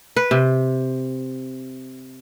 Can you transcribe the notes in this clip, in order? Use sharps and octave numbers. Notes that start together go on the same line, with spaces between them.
B4
C3